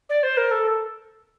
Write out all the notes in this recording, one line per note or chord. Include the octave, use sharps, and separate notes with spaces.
D5
C5
A#4
A4